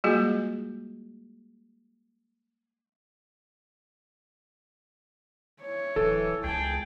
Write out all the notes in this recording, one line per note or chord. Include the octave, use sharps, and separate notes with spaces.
G3 G#3 A#3 F4 F#4 G#4
E4 C#5
D1 E3 A4
C#2 G#4 G5 A5